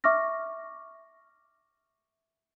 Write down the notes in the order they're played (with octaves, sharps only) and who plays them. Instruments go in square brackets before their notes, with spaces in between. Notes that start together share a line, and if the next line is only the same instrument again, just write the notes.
[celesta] E5 C#6 D6 F6 A#6